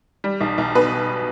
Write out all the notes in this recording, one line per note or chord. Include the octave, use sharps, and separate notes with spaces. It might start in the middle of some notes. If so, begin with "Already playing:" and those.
G3
B1
B1
B2 B4